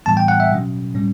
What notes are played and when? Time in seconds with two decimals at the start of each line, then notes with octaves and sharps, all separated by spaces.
0.06 A2 E3 G3 B3 A5
0.17 G5
0.28 F#5
0.40 E5
0.51 B2 F#3 C#4
0.95 A2 G3 C#4